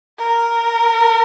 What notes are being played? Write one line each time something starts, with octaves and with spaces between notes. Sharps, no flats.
A#4